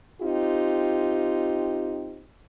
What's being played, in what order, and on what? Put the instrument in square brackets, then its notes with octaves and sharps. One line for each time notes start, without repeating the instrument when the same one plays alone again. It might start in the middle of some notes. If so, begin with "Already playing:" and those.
[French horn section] C4 D#4 F4 G4